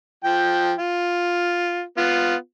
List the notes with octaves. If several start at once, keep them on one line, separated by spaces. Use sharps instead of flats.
F3 G5
F4
B3 F4